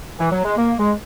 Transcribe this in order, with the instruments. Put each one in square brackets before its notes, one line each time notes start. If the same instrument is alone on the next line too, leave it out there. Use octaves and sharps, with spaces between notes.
[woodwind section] E3
F#3
G#3
A#3
G#3